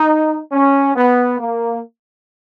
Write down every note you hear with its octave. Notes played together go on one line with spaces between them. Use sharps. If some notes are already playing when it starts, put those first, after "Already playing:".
Already playing: D#4
C#4
B3
A#3